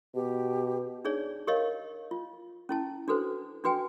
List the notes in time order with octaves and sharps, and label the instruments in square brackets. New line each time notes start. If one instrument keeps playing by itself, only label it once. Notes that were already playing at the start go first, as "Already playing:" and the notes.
[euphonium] B2 [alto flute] G4
[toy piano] D4 D#4 G#4 C#5 D5
G4 A#4 C#5 D#5 F5
F4
C#4 E4 A5
D4 F#4 A4 B4 C5
D4 F#4 B4 G5 G#5